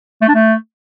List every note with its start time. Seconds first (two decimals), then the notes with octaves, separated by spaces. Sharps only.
0.22 A3
0.28 D4
0.35 A3